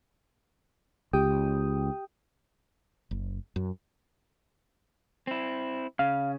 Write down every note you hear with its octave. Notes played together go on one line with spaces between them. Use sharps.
C#2 G4 G5 D#6
F#1
F#2
C4 E4
C#3 F5